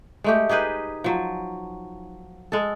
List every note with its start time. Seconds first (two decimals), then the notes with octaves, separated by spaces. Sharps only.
0.24 G#3 A3 G4
0.49 D#4 G4 G#4 B4
1.04 F3 F#3
2.52 G#3 A4